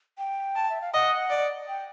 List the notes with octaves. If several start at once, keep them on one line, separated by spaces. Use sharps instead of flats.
G5
A5
E5
F5
D#5 F#5
D5
G5